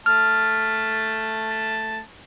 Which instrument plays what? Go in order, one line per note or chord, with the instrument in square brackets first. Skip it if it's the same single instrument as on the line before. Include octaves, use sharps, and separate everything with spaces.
[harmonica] A3 A5 [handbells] F6